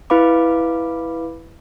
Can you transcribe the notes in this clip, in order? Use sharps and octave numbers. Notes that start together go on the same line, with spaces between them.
E4 B4 F5 B5 D6